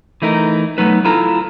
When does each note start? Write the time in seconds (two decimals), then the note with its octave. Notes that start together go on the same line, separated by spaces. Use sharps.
0.22 E3 A3 D#4 A#4
0.78 F#3 A3 B3 D#4 B4
1.05 E4 F4 A4 A#5